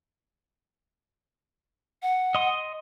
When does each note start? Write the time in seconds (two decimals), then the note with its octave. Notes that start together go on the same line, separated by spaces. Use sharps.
2.02 F#5
2.35 D#5 C6 D#6